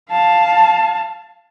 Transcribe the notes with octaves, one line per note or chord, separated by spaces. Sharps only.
F5 A5